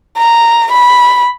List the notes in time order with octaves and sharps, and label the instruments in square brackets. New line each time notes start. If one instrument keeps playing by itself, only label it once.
[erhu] A#5
B5